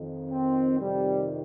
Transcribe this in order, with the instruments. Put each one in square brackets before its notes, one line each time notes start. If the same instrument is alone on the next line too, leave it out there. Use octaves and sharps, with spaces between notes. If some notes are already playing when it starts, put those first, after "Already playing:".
Already playing: [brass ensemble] F2 D#3
C4
F2 C3 D#3 G3